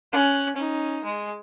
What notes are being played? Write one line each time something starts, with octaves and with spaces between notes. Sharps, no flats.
C#4 F#6
C#4 D#4
G#3